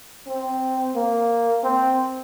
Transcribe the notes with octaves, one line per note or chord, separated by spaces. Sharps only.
C4
A#3
C4